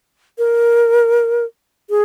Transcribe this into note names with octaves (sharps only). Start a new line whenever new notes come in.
A#4
G#4